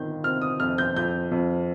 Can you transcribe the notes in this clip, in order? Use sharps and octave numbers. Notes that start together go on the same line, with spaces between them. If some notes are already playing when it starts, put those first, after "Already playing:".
Already playing: G1 D#3 G6
C3 F6
D#6
F2 F6
G6
F2 G6
F2